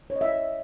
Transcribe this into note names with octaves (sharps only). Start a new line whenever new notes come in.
C#5
D#5
E5